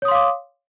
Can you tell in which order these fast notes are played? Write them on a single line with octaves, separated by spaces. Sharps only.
C#5 D#6 C6 F5 D6